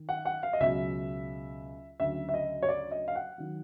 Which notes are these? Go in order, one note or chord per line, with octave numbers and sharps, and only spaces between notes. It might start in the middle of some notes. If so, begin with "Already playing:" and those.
Already playing: D#3
F#5
F#5
F5
D#5
C#2 B2 F#3 E5
D2 C#3 F#3 E5
E5
D#5
C#5
D5
D#5
F5
F#5
D#3 F#3